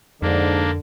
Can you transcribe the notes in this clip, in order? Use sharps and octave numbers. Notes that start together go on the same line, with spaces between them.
F2 G#2 D3 A#3 D4